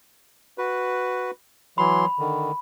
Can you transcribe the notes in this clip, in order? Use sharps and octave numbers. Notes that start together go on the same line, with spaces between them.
F#4 B4
E3 F#3 B5 C6
D3 D#3